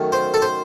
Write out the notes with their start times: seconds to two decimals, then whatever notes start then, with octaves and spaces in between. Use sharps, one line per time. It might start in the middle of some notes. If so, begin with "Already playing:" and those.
Already playing: F#2 D#3 A3
0.12 C5
0.34 A4
0.42 C5